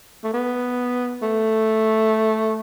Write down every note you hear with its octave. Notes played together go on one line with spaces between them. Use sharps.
A3
B3
A3